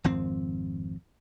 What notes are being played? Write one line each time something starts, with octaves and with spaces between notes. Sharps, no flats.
G#1 F2 C4